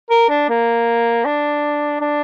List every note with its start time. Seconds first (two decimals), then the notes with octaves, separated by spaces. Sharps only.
0.10 A#4
0.29 D4
0.49 A#3
1.25 D4
2.01 D4